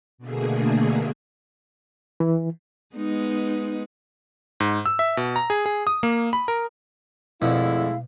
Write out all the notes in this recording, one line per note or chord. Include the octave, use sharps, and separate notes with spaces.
B2 D3 A3 A#3 G#4
E3
G#3 B3 D#4
G#2
E6
E5
B2
A#5
G#4
G#4
D#6
A#3
B5
A#4
F2 B2 D3 G#3 A3 E4 F5